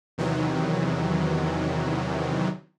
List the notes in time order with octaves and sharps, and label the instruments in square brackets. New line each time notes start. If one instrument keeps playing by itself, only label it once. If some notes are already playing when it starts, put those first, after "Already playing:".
[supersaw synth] E2 C3 D#3 E3 F#3